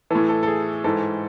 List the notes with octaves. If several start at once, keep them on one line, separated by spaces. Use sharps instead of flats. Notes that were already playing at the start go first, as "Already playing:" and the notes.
A2 E3 A4
A4
A4
G#4
G#2 E3 A4